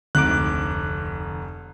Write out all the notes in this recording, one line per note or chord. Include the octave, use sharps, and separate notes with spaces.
F1 D2 G#2 C4 D6 F#6